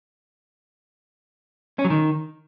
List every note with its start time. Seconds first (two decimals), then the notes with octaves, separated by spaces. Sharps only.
1.79 C#4
1.85 F#3
1.90 D#3